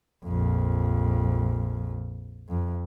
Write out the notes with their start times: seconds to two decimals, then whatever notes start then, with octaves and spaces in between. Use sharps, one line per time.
0.24 A#1 F2
2.48 F2